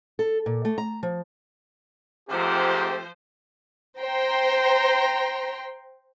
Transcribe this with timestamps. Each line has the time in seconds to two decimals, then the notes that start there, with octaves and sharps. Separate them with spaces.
0.19 A4
0.46 A#2
0.65 A3
0.78 A#5
1.03 F3
2.30 G#2 C3 F3 A3 C4 G4 C5
4.00 C5 G5 A#5 C6